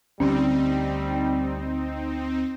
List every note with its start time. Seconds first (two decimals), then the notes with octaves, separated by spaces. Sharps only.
0.20 D2 D3 G3 C4 C#4 D#4